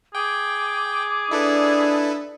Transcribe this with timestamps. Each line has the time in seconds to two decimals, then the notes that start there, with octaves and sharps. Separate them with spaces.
0.15 G#4 G5 D6
1.31 D4 E4 A4 B4